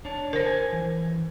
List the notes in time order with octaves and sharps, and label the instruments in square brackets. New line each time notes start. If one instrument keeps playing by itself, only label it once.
[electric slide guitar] D4 C#5 A5
[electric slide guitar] D3 [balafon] A#4 C5
[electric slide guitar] G#5
E3